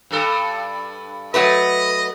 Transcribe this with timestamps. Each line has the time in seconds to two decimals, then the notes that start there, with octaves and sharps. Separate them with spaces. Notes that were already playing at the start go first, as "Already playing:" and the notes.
0.11 G2 A4
1.34 F#3 A3 B4 D#5